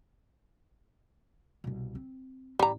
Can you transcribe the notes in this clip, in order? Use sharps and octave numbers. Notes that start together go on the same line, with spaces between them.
C2 B2
C4
A1 G3 A#5